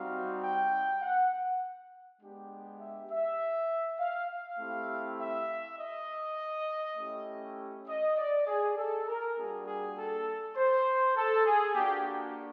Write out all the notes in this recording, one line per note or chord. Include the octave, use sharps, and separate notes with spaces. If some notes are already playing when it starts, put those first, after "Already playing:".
Already playing: G3 C4 D#4 F#4 F5
G5
F#5
G#3 B3 D4 G4
E5
E5
F5
F5
A3 C4 E4 G4
E5
D#5
A3 C#4 E4 G4
D#5
D5
G#4
A4
A#4
G3 A#3 D4 F#4 G#4
G#4
A4
C5
A4
G#4
A#3 D4 F#4 G4